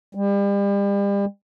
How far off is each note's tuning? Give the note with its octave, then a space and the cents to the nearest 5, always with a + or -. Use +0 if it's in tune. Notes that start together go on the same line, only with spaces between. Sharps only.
G3 +35